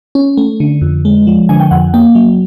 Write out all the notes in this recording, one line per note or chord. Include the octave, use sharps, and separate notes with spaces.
C#4
A3
D3
F2
G#3
F3
D3 G#5
G5
F2 F#5
A#3 G5
F#3